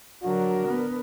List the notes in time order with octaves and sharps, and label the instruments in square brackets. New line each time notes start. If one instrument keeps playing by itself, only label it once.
[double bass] D3 F#3 [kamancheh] D4 A#4 [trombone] F#4
[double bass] B3